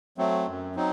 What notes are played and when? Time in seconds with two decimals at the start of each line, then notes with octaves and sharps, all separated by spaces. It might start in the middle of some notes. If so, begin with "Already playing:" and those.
0.18 F#3 A3 C4
0.47 F#2
0.76 F#3 C4 D#4